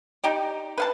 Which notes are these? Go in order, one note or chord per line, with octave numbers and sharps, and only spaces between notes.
D#4 G4 D5
B4 F5 A5